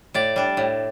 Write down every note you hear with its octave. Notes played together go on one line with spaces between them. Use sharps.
A2 D5
G3 D4
A2